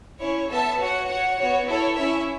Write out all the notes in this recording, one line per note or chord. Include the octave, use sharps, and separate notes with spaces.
C#4 E4 C#5
B3 A4 E5 A5
F#4 C#5 F#5
F#4 C#5 F#5
B3 F#4 C#5
E4 A4 C#5
C#4 E4 C#5 E5